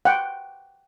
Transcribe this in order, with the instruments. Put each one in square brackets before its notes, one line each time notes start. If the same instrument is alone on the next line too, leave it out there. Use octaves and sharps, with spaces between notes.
[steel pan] F#5 G5